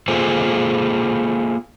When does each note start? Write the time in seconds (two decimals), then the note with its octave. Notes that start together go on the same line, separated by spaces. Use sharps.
0.08 A#3 F4 G#4 A4 C5